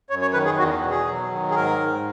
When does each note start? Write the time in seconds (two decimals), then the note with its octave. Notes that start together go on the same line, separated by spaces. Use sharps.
0.10 F#2 C#5
0.22 C#5
0.33 D#3 B4
0.45 G#4
0.58 E2 F#4
0.83 B2
0.90 G#4
1.07 F#3
1.31 D#3
1.50 G#4
1.55 G#2 A#4
1.79 G#2